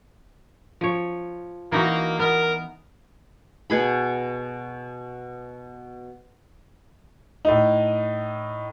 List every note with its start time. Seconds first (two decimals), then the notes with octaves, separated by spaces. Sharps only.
0.81 F3 C#5
1.72 E3 A#3 D#4 F#4 A#5
2.19 B3 A#4
3.70 B2 G#4 B5
7.45 A2 D#4